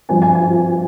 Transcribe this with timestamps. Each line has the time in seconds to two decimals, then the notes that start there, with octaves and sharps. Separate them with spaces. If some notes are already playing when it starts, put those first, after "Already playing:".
0.09 G2 F3 C4 G#5
0.22 G#5
0.35 G#5